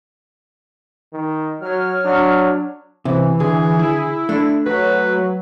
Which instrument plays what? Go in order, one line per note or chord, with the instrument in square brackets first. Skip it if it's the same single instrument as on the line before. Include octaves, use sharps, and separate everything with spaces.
[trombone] D#3
[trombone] F#3 [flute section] C#5 F6
[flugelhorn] F#3 [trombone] D4
[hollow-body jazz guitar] C3 [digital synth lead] E3
[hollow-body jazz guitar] D3 [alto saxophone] G#4
[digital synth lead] E4
[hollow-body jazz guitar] A3 [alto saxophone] D4
[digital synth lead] F#3 [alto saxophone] B4